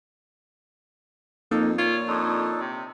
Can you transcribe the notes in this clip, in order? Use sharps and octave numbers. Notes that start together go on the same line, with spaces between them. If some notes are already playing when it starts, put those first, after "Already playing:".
F2 A#3 D#4 A4
A#2 F4 C#5
F2 D4 D#4 A4
C3